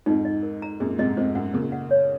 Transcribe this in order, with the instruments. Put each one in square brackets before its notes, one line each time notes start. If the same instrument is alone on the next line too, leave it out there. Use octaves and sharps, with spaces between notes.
[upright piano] F2 G#2 [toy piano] D#4
[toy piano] D#5
A#4
A#5
[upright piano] F#2 A#2 [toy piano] G#4
[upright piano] G#2 C3 [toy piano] D#5
[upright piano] F2 G#2 [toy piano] C5
[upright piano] F#2 [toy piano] F#5
[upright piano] A#2 C#3 [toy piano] A#4
[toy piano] F#5
C#5